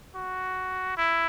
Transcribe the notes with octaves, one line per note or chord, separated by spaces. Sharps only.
F#4
E4